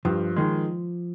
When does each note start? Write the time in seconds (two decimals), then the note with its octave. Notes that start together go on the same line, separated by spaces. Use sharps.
0.05 G2 F3
0.36 D#3 G#3